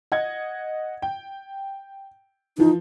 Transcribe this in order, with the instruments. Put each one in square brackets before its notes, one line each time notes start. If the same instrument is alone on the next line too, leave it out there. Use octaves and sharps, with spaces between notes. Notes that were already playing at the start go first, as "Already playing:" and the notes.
[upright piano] D#5 F#5 G#6
G5
[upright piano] E3 F3 [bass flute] D#4